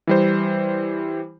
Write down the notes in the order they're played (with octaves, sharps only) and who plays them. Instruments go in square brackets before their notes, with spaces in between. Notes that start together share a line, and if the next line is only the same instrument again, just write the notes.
[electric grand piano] E3 G3 C5